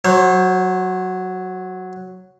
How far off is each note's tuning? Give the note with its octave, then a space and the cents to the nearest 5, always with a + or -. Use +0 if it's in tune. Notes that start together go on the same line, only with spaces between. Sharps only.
F#3 +0 C5 +40